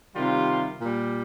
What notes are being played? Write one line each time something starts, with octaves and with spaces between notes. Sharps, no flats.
C3 D#3 G3 F4
A#2
G3